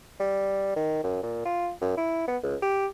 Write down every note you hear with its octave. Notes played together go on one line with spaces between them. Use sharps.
G3
D#3
F#2
A#2
F4
F#2
E4
B3
C#2
G4